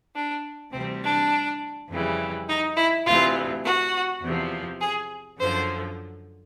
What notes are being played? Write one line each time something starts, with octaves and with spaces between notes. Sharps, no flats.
D4
D2 C3 E3 G3 C4
D4
F2 C#3 E3 G3
D#4
E4
D2 C3 E3 F4
F#4
E2 C3 F3
G#4
F#2 D3 F3 C5